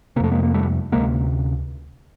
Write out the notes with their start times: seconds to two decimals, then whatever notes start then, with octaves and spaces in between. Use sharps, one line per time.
0.16 C3 A#3
0.20 F2 A3
0.31 G#3 A#3
0.43 A#3
0.54 G3 A3
0.92 D2 C3 G#3 A#3